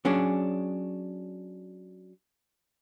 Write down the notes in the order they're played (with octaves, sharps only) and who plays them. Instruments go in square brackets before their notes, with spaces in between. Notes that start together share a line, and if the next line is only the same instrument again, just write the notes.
[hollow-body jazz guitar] F#3 C#4 D4 G#4